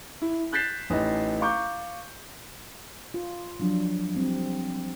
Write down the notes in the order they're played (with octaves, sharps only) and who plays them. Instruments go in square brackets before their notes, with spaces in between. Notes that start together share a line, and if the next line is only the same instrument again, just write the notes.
[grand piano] E4
F#6 G6 A6 B6 C7 E7
A1 D#4 B4 D#5
F5 A#5 C#6 D6 G6
[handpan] F4
F3 F#3 D4
G3 C4